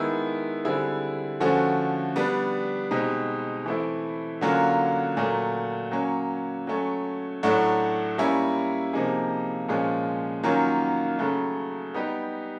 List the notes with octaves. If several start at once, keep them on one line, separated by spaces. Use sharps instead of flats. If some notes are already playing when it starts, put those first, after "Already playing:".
Already playing: D#3 G#3 B3 E4
D3 G3 C4 E4 G#4
D3 F3 A3 C#4 F#4
G3 B3 D4
B2 G#3 C4 D#4 G4
E3 A3 C4 E4
D3 F#3 A#3 C#4 F4
A#2 F#3 A3
F#3 A#3 C#4
F#3 A3 C#4
A2 F#3 A3 D4 F#4
G3 A#3 C#4 E4
C3 F3 A#3 D#4 G#4
A#2 F3 G#3 C#4
D#3 F#3 A#3 C#4 F4
C#3 F#3 A3
G3 B3 D#4 G4